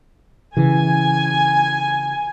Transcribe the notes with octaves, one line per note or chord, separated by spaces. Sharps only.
C#3 E3 G#5